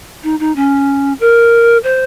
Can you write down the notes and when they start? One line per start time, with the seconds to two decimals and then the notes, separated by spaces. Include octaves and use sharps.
0.24 D#4
0.40 D#4
0.56 C#4
1.20 A#4
1.84 C5